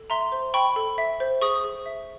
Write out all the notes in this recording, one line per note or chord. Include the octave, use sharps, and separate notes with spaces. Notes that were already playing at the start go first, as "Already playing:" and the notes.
Already playing: A4
E5 A#5 C6
C5
G5 B5 C#6
A4
E5
C5
G#4 C#6 D#6
G#4
E5